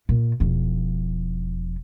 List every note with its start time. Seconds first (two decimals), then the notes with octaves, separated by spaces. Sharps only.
0.09 A#2
0.40 E1 F3